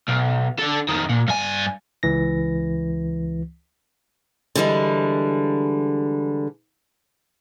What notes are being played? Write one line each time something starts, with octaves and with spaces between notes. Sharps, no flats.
B1
D3 A4
F2 D#3
A#2
G2 G#5
C#2 E3 A#6
D3 E3 G3 G#3